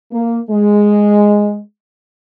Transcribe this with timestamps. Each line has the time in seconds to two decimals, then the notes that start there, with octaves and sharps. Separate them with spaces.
0.12 A#3
0.50 G#3